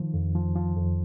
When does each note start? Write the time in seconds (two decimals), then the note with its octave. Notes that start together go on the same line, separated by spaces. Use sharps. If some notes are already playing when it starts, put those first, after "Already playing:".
Already playing: D#3 F3
0.14 F2
0.35 F3
0.56 F3
0.76 F2